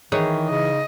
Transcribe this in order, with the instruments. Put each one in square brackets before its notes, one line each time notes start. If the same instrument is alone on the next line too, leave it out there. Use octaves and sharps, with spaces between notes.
[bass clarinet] D#3 [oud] E3 G#4 C#5 [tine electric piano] D#4 D#6
[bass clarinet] C#3 [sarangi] D#5